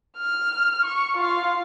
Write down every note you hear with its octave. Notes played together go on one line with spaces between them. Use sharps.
F6
C#6
F4 F5